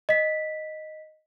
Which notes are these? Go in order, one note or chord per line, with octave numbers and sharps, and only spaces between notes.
D#5 B6